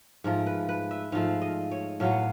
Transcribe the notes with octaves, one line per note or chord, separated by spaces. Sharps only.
G#2 F3 A3 A#4
B4
B4
E5
G#2 F3 A3 F5
D#5
C#5
A2 F#3 B3 F5